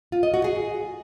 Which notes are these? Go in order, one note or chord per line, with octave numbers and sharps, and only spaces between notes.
F4
D#5
F#4
G#4